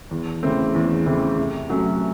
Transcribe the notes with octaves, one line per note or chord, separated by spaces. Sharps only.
E2
C#3 E3 A3 C4
E2
C#3 E3 A3 C4
C3
F#3 A3 C#4 F#4